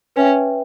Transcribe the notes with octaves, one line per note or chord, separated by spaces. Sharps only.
C#4 B4 E5 G5